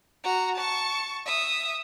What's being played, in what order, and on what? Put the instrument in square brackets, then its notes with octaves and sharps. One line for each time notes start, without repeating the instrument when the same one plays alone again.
[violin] F#4 A#5
A5 C#6
E5 D#6